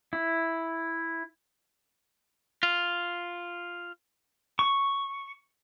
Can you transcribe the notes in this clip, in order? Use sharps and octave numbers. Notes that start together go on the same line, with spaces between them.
E4
F4
C#6